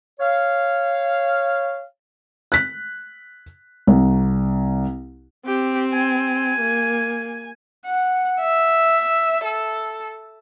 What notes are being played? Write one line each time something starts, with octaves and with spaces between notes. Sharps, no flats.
C#5 F5
F#6 B6
C2
C4 G4
G#5
A#3
F#5
E5
A4